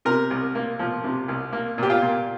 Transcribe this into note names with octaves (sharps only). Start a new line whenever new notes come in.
C3 A#4
C2
A#3
F3
C3
C2
A#3
A#2 G4
F4
A#2